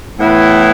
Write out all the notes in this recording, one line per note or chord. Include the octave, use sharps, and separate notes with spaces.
A2 E3 B3 E4 B4